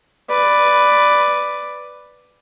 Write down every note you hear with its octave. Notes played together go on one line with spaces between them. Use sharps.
B4 D5